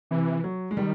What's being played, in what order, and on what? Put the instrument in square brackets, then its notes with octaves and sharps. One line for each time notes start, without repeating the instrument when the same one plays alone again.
[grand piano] C3 [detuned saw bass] E3
[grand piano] F#3
G#3
[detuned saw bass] D#3 [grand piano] G3